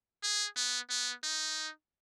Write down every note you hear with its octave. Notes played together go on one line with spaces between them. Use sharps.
G#4
B3
B3
D#4